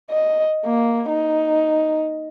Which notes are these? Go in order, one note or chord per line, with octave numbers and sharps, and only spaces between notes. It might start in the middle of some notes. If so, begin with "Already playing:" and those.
D#5
A#3
D#4